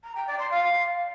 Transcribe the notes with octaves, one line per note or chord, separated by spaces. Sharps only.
A#5
G5
D5
C6
F5